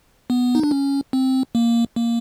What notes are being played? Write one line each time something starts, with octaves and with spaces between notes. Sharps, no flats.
B3
D#4
D4
C#4
C4
A#3
A#3